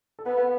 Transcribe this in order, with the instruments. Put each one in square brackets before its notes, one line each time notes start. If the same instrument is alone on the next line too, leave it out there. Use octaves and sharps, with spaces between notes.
[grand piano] A4
[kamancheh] B3 [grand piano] B4